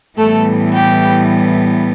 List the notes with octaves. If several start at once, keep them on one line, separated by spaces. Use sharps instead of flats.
A2 E3 G3 A3 B3 A4
G4